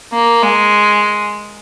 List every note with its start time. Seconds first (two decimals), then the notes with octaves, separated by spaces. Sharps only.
0.13 A#3
0.43 G#3